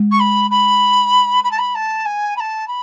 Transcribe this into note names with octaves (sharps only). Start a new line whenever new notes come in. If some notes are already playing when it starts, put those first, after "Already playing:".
Already playing: G#3
C#6
B5
B5
B5
A5
B5
A5
G#5
B5
A5
B5